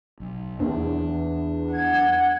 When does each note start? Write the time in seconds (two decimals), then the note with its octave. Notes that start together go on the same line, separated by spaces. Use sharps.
0.20 B1
0.60 E2 D4
1.72 F#5 G#6